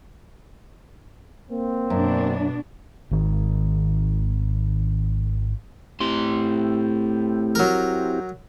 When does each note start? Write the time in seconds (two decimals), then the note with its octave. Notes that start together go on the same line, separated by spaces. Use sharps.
1.51 A#3 C4
1.90 F#2 B2 D4
3.11 G#1 D#3
6.00 A2 C4 E4 G4 C6
7.55 F#3 A#4